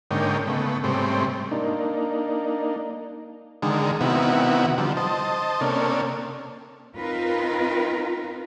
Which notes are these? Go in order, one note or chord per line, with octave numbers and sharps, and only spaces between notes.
G#2 D3 A#3 C#4 D#4 G5
C#3 A3 B3
G#2 C3 G3 A3 C4 C#4
A#3 D4 D#4
D3 D#3 G#3
C3 D#3 B3 E4 F#4
D3 F3 G3
C5 D#5 A5
C3 A#3 C#4 D4 A4
C4 D#4 F4 A#4 B4